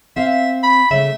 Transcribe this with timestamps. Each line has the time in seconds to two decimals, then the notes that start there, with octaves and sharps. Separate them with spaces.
0.16 C4 E5 F5
0.63 B5
0.91 C#3 A3 E5